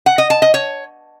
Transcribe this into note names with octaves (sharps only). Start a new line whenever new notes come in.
F#5
D#5
A5
D#5
C#5